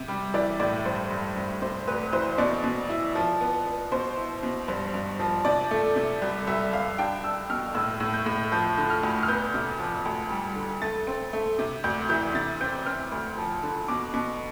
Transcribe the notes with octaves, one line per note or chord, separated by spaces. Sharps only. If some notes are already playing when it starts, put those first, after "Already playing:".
Already playing: C3
G3
E3 D5
A2 D5
G2 C5
G2
G2
C3 C5
D2 B4
E3 C5
B2 D5
B2
E4
F3
B3
B3
B2 C5
E4
B2
G2 C5
G2
F3
C3 D5
A3
C3
C2
C2 E5
C2 F5
D4 G5
D4 E6
B2 F6
A2 E6
A2
G6
A2
F3 G6
D3
F6
D2
F6
B3 G6
C3
F3
D2
G3
D3
A3 A6
C4
A3
C3
D2 G6
E3 G6
C3 A6
C4 G6
C4 F6
D2
F3
D3
B2 D6
B2